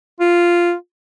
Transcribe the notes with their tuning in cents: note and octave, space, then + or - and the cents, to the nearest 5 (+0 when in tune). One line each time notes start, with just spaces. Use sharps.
F4 -5